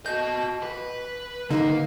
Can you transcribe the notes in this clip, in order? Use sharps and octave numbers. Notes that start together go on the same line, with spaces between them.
F#4 D#5 G6
B4
D3 A#3 D#4